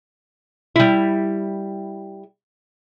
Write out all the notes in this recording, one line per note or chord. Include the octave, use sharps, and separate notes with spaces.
G3 E4